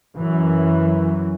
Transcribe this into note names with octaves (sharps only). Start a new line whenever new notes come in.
F#2 E3 F#3